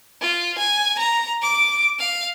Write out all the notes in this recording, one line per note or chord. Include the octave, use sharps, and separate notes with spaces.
F4
G#5
A#5
D6
F5